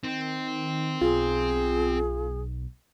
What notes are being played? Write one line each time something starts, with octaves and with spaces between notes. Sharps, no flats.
D#3 C4
B1 F4 G#4